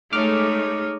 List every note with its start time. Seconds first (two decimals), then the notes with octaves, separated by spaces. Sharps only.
0.13 G#3 A3 D#4 C#5 D6 F6